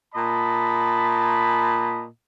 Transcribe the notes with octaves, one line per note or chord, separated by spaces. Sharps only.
A#2 D#5 A5 B5